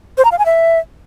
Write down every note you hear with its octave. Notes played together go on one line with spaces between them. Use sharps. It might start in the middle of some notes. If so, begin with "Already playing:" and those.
C5
A#5
F5
G#5
E5